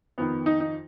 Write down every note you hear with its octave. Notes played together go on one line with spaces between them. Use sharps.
F2 D#3 B3
D#4
D#4